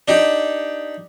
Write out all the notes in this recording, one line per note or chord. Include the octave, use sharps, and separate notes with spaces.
D4 D#4 G4